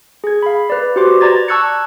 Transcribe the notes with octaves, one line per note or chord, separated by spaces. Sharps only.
G#4 G#6
F5 B5
B4 D5
F#4 G4 B4 C5 C6 D6
D5 A#5 G#6 A6
A5 C#6 E6 F#6 G#6 C#7